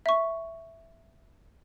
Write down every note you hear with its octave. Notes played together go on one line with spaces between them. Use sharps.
E5 C#6